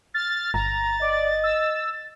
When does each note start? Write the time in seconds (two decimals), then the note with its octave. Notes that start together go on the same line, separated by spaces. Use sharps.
0.14 F6 A6
0.54 G1 A#5 A6
1.02 D5 D#5
1.44 E6